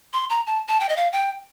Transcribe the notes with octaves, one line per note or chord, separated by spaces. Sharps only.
C6
A#5
A5
A5
G5
D#5
F5
G5